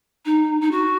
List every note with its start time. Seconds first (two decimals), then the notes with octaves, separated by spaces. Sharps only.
0.25 D#4
0.61 D#4
0.71 F#4